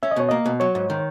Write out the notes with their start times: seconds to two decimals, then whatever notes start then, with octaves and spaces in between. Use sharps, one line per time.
0.03 C#4 E5
0.11 D#5
0.16 B2 C#5
0.29 A#3 D#5
0.46 B2
0.60 F#3 C#5
0.75 G#2
0.90 D#3